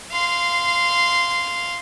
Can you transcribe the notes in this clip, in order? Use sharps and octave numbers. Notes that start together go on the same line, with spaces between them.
F5 C6